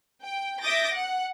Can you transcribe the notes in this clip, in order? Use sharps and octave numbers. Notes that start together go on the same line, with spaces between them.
G5
E5 D6 D#6 G6 A6 A#6
F#5